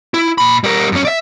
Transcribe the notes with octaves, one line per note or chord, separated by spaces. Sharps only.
E4
A#2 B5
G3 A#4
F#2 C#4
D5 E5